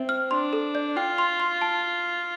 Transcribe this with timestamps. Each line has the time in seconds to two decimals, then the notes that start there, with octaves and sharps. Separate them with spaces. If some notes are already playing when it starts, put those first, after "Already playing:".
Already playing: C4 E5
0.09 F6
0.31 D4 C6
0.53 A4
0.75 D5
0.97 F4 G5
1.18 C6
1.40 C6
1.61 A5